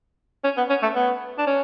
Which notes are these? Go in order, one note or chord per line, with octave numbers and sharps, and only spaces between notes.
C#4
B3
C#4
A3
B3
D4
C#4